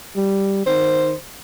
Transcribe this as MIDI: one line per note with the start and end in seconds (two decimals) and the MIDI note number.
0.16 0.62 55
0.67 1.14 51
0.67 1.15 72